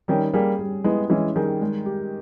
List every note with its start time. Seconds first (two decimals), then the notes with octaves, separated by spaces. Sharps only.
0.08 D#3 G3 C#4
0.33 G3 A#3 G#4
0.59 G3
0.84 G#3 B3 E4
1.10 E3 G#3 C#4
1.36 D#3 G3 G#4
1.61 G#3
1.86 G4